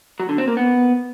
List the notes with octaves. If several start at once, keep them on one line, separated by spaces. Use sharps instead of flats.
F#3
D3
C4
A#3
B3